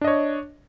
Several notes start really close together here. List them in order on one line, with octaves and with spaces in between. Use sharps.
D4 D#5 C#5